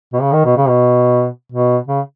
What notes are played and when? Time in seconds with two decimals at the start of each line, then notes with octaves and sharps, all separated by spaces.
0.13 B2
0.21 C#3
0.33 D#3
0.45 B2
0.57 C#3
0.69 B2
1.52 B2
1.88 C#3